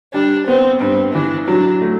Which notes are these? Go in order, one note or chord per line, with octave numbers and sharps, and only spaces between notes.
G3 D4
B3 C4
G2 C4
E3 D4
F#3 D4
A3